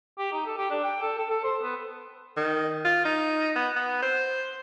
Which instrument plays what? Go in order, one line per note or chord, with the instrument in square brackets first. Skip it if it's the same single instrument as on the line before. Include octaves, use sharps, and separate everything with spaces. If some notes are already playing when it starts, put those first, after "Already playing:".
[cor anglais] G4
D#4
A4
G4
D4
G5
A4
A4
A4
C5
B3
[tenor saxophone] D#3
F4
D#4
B3
B3
C5